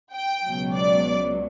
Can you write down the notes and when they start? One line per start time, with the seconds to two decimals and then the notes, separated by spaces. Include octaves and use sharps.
0.14 G5
0.44 C#2 B2 F#3
0.75 D5